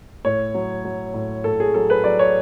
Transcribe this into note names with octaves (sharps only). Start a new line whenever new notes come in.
A2 C#5
F#3
F#3
A2
A2 A4
G#4
F#3 A4
B4
F#3 D5
C#5